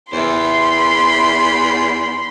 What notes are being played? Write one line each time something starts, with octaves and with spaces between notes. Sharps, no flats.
E2 C5 E5 B5 C6